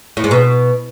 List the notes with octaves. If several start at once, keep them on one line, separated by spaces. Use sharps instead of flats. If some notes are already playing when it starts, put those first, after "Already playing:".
A2
G#2
B2